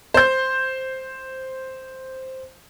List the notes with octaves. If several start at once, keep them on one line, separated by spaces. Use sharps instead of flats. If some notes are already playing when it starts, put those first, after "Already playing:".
C5 G6